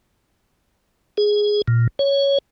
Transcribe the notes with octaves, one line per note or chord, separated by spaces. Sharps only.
G#4
A#2
C#5